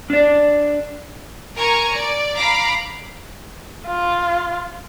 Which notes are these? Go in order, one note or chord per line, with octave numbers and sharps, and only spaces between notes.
D4 D5
A#4 G#5 A#5 C#6
D5
F5 A#5 B5 D6
F4